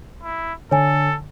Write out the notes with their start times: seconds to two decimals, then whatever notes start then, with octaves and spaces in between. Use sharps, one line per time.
0.23 E4
0.71 D3 A4 C#5 G#5